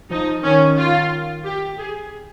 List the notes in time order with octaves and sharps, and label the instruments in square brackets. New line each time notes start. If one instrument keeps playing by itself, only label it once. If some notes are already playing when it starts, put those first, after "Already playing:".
[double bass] F3 [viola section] D#4
[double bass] D#3 [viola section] C#4
[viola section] F4
G4
G#4